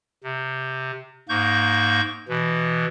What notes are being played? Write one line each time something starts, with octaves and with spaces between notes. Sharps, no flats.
C3
G#2 A#3 C#6 G6
B2 E3